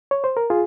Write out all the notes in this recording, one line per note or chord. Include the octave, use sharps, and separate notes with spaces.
C#5
C5
A#4
F4 G#4